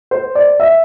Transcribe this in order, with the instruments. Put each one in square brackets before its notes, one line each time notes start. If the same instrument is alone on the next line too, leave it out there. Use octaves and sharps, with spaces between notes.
[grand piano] C5
D5
E5